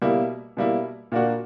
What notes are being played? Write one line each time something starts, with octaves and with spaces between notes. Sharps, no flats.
B2 G3 A#3 E4
B2 G3 A#3 E4
A#2 A#3 D4 F#4